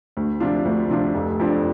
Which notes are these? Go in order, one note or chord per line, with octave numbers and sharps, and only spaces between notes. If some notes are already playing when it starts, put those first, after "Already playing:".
D2
C3 F3 D4 F4
D2
C3 F3 D4 F4
F1
F2 F3 D4